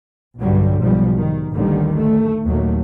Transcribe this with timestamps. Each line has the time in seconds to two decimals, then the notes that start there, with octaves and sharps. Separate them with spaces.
0.40 B1 G2 D3 F#3 G3
0.80 B1 G#2 B2 F3 G3
1.18 D#3
1.54 A1 D#2 D3 D#3 G3
1.99 A3
2.47 D#2 A#2 F#3 A3